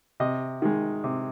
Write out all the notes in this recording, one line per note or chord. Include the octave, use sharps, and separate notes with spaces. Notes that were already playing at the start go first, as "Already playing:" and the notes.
C3 D#5
D#3 G#3
C3